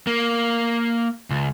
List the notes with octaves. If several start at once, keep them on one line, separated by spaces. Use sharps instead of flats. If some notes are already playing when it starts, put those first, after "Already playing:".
A#3
C#2